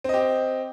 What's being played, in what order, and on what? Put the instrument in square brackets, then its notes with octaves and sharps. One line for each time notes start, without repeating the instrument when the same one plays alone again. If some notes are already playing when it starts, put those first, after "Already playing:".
[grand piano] C4
D#5
G4